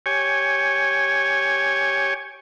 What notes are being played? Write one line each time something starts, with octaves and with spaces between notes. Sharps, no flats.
G4 C#5 G#5